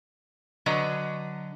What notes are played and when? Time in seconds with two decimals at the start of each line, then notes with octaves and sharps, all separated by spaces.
0.66 D3 F#3 B4 D#5 A#5